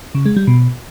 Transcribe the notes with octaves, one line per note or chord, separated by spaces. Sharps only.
C#3
G#3
G3
B2